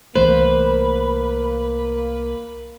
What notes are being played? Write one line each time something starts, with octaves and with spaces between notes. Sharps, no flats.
C2 E3 A3 A#3 B4 C5